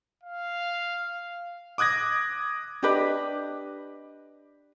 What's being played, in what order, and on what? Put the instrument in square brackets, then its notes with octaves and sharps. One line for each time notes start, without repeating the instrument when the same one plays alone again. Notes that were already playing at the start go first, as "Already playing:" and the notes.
[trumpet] F5
[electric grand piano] D6 D#6 F#6 G#6 A#6
[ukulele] D4 G4 B4 D#5